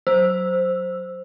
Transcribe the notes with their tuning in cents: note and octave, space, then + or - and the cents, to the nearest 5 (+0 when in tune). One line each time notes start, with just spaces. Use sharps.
F#3 +0 C5 +0 E6 +0